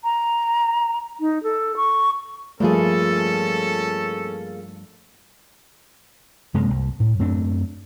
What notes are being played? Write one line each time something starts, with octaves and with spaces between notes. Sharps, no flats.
A#5
D#4
A4
C#6
G2 F3 A3 A#3 C#4 F4 G#4 A4
F#2 C3 G#3 A#3
C2
A2
F#2 A3 C4 D4